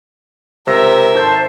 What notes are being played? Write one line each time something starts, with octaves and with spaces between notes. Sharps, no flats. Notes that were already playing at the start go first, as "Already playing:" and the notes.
C#2 C3 A#4 E5 E6 A#6
G#1 A4 C5 A5 G6